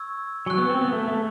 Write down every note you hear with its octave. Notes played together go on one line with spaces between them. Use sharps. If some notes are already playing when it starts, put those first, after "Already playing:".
Already playing: C#6 E6 G#6
F#3 G#5 C#6 F#6
B3
C4
B3
A3
A3